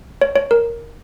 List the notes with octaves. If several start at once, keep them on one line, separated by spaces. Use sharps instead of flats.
C#5
C#5
A#4